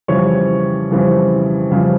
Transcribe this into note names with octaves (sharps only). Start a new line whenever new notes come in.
F2 C#3 E3 G3 C4 C#5
F2 C#3 E3 G3 C4
F2 C#3 E3 G3 C4